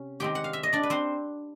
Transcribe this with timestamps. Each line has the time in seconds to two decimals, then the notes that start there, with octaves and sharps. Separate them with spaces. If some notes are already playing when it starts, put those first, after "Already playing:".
Already playing: C3 C#4
0.20 D#3 G#3 C4 G4 G5
0.35 F#5
0.44 F5
0.53 E5
0.63 D#5
0.73 D4 D5
0.83 B4
0.90 C4 C5